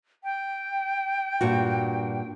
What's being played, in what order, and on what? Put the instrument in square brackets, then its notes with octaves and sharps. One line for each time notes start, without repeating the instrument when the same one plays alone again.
[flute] G5
[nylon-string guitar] G2 A#2 F#4